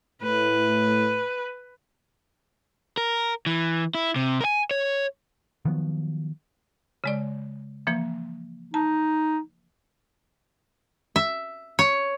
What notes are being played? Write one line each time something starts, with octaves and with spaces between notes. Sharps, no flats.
A2 B4
A#4
E3
E4
C3
A#4 G#5
C#5
D#3 F3 F#3 B3
C#3 G#3 D5
E3 F3 A#3
D#4 A5
E5
C#5